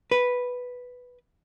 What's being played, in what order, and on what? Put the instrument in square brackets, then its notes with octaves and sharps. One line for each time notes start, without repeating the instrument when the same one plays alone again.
[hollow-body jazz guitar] B4